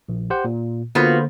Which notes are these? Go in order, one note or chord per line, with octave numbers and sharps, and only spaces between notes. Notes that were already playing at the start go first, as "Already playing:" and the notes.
A#1
G4 C5 F#5
A#2
D3 A#3 B3 F4 F#4 C5